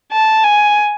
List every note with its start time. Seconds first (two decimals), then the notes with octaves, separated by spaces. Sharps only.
0.12 A5
0.44 G#5